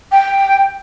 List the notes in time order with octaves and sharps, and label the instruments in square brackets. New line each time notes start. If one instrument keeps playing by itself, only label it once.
[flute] G5